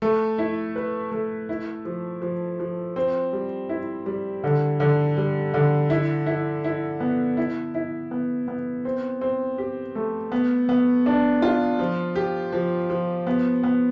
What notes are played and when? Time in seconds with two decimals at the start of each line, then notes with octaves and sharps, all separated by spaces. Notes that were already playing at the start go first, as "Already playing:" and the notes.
0.02 A3
0.38 E4
0.76 B4
1.11 A3
1.49 E4
1.85 F3
2.22 F3
2.60 F3
2.96 C4
3.33 G3
3.69 E4
4.06 G3
4.44 D3
4.80 D3
5.17 G3
5.54 D3
5.90 E4
6.26 E4
6.64 E4
7.00 B3
7.37 E4
7.75 E4
8.11 B3
8.48 B3
8.85 C4
9.21 C4
9.58 G4
9.95 A3
10.32 B3
10.69 B3
11.06 D4
11.42 F4
11.79 F3
12.15 G4
12.52 F3
12.90 F3
13.27 B3
13.63 B3